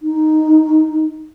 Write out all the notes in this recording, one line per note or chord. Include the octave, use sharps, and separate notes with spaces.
D#4